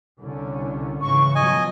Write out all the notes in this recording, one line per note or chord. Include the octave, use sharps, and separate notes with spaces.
C2 D3 C#4
G#2 C#3 E3 C#6
B2 F3 F#3 D#5 G#5